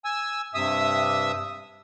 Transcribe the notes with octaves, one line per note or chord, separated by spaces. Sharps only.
G#5 E6
G2 C3 E5 D#6 E6